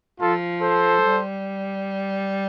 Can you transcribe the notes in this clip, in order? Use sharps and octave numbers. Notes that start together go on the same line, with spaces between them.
F3 F4 A4
A4 C5
G3